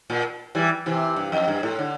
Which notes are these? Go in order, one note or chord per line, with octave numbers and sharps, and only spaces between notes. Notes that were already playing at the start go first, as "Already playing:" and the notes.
A#2
E3 G3
C3 E3
G2
F2
G2
A2
D3